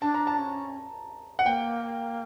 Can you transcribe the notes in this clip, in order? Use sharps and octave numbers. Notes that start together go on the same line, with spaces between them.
D4 A5
A#5
A5
C#4
F#5
A#3 G5